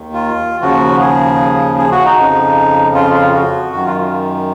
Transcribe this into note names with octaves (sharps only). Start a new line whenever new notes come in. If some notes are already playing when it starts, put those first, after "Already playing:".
Already playing: D#2 D#3
F4
D#2 C#3 F3 F#4
G#4
G#4
F#4
D#4
F2 C#3 F3
F4
F4
F#4
F#2 D#3 F#4
F4